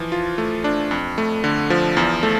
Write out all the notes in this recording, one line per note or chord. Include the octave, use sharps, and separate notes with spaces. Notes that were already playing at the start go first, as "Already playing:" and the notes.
Already playing: E3 F3
F4
A3
D4
F2
A3
D3
F3
E2
A3